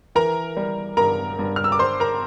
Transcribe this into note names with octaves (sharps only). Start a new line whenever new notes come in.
E3 A#4 A#5
G3
G2 A#4 A#5
G2
F6
E6
D6
G3 C5 C6
A#4 A#5